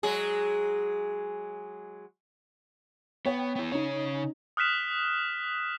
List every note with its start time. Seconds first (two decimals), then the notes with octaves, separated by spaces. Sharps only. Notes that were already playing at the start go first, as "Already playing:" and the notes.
0.03 F#3 G#3 G#4
3.26 B3 C#5 G5
3.56 B3 E4
3.72 C#3 C#4 D#4 C#5
4.57 D#6 F6 F#6 B6 E7